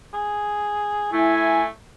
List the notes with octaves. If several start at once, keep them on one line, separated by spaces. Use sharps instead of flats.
G#4
A3 E4 G#5